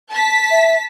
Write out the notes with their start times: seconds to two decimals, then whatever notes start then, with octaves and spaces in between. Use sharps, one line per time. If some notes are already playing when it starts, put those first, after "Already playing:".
0.11 A5 B6
0.51 E5